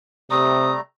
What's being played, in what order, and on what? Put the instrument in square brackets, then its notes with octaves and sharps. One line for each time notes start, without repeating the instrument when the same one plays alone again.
[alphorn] C3 [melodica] G3 A3 A#5 [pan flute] D#6